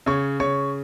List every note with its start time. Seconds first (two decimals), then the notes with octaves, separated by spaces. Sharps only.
0.06 C#3 C#5 C#6
0.40 C#3 C#5 C#6